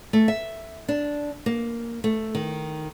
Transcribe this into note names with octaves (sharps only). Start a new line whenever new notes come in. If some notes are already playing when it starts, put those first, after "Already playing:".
A3
E5
D4
A#3
A3
D#3